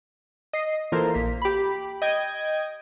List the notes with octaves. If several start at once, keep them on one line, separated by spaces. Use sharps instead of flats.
D#5 C7
E3 A#3 F4 A4 A#4 C5
A#1 A#3 B6
G4 B5
D#5 G5 D#6 G#6